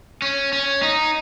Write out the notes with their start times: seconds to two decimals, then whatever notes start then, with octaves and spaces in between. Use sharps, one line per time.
0.22 C#4
0.53 C#4
0.83 D#4